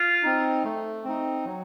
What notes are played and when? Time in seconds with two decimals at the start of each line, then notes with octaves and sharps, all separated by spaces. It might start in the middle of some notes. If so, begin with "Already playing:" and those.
Already playing: F4
0.23 C4 D#4
0.64 A3
1.04 C4 D#4
1.45 F#3